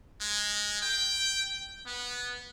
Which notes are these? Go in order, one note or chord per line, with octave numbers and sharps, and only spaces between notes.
G#3
G5
B3